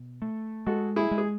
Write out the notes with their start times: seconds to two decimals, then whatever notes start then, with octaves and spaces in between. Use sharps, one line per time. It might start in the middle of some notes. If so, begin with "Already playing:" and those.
Already playing: B2
0.22 A3
0.66 G#3 F#4 A4
0.96 E4 G#4
1.11 G#3
1.18 G#4